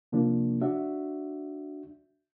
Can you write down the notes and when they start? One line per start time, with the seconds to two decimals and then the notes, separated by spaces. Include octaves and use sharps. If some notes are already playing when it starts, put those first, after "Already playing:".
0.12 C3 F3 A#3 D4
0.61 D4 F#4 E5